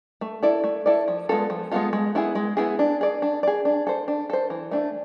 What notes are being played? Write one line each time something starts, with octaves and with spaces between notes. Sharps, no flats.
A3
E4 A4 D5
A3
E4 A4 D5
F3
G#3 B3 F4 A4
F3
G#3 B3 F4 A4
G#3
B3 E4 G#4
G#3
B3 E4 G#4
D4
G#4 D5
D4
G#4 D5
D4
A4 C5
D4
A4 C5
E3
A3 D4